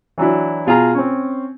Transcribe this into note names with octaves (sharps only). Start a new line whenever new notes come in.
E3 F#3 D4 E4
B2 F4 G#4 A#5
C4 C#4